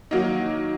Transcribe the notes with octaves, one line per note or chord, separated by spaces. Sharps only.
D#3 F#3 A#3 D#4